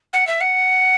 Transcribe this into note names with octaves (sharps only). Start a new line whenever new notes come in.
F#5
E5
F#5